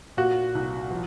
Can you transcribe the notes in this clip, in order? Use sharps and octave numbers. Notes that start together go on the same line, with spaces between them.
A#2 F#4
C2
F3